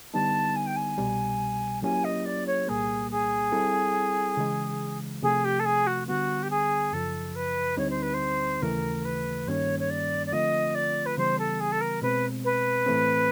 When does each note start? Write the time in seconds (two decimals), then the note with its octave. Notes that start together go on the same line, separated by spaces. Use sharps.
0.14 D3 G3 B3 D#4 A5
0.55 G#5
0.66 G5
0.76 G#5
0.98 C2 B2 G3
1.82 F#3 A#3 C#4 E4 G4 G#5
2.04 D#5
2.25 D5
2.46 C#5
2.67 C2 A#2 G3 A#3 G#4
3.11 G#4
3.52 G3 C4 E4 A4
4.37 C#3 E3 G#3
5.22 C3 F3 A3 G#4
5.44 G4
5.59 A4
5.65 G#4
5.86 F#4
6.07 D3 G3 B3 F#4
6.42 G4
6.50 G#4
6.92 F#2 C#3 F3 A4
7.35 B4
7.77 D2 D3 G3 C4 D#4 C#5
7.90 C5
8.02 B4
8.13 C5
8.62 D#2 C#3 E3 A3 A#4
9.04 B4
9.47 G2 D#3 G3 A#3 C#4 C#5
9.79 C#5
9.90 D5
10.26 D5
10.32 D3 F3 A3 C4 F4 D#5
10.74 D5
11.05 B4
11.17 C#3 E3 G3 B3 C5
11.38 A4
11.60 G#4
11.71 A4
11.80 A#4
12.02 B2 G#3 C4 B4
12.44 B4
12.86 A2 E3 A3 C4